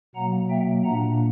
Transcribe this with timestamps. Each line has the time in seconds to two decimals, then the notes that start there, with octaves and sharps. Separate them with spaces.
0.15 B2 F#3 A#3 F#5 A#5
0.49 E5 G5
0.84 A#2 A#3 D4 F#5 A#5